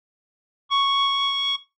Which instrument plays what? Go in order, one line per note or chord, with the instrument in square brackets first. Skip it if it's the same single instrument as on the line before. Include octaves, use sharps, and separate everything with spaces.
[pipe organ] C#6